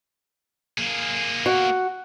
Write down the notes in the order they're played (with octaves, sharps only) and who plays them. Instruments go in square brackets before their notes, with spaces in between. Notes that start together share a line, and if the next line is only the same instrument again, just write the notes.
[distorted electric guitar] A#3 G#4
[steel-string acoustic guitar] F#4